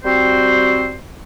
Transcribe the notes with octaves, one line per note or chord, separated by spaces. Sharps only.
G3 C4 F#4 C5